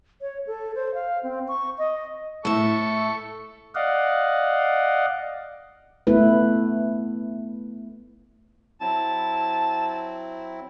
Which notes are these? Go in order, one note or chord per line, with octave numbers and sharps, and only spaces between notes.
C#5
A4
C5
F5
C4
C#6
D#5
A2 A4 E5 C#6
D5 D#5 F5 F#5
A3 B3 E4 B4
F#3 C4 E4 A5